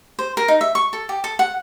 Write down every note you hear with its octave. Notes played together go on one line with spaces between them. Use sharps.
C5
A#4
D#4
E5
C#6
A4
G4
A4
F#5